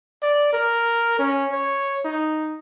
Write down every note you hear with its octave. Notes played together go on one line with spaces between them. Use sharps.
D5
A#4
C#4
C#5
D#4